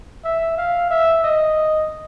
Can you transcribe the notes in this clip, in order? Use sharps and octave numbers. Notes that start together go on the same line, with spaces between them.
E5
F5
E5
D#5